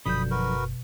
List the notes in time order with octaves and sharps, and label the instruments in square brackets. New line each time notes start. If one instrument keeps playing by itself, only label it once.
[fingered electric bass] F#1 [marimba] B2 G6 [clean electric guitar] D3 F3 F#3 [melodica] B5 D#6
[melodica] F#4 A#4 B4